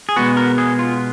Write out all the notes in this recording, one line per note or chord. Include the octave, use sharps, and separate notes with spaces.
G#4
B2 G#3 B3 F#4
A#4
G#4
F4